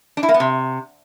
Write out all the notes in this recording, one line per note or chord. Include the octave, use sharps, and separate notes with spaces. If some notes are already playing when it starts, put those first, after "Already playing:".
D4
E4
A#3
B3
C3